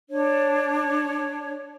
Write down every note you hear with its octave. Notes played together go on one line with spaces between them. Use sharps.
D4 C#5